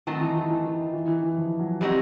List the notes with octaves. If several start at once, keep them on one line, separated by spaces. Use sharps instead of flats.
A2 D#3 F#3 A3 C4 D#4
E3
E3
E3
E3
E3
E3
E3
F3
F#3
E3 G3 G#3 C4 D#4 F#4